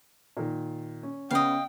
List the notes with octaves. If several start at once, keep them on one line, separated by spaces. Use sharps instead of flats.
A#2 D#3
C#4
C#3 B3 C#4 D#5 F5 G5